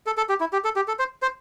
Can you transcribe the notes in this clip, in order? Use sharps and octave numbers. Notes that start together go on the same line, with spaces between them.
A4
A4
G4
E4
G4
A4
G4
A4
C5
C5